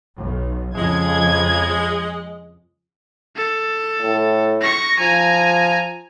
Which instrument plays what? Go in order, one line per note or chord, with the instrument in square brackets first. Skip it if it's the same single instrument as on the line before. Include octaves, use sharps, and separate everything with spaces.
[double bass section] B1
[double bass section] F2 C#3 F3 [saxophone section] G#3 [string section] G#6
[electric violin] A4
[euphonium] A2
[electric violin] C#6 A#6
[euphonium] F3 [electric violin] G#5 A#5